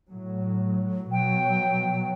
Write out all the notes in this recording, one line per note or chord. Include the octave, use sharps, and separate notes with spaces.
A2 F#3
B2 F#3 G5